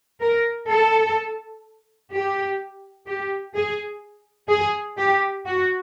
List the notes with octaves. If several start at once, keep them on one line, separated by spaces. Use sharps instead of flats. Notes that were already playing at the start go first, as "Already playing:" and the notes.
A#4
A4
G4
G4
G#4
G#4
G4
F#4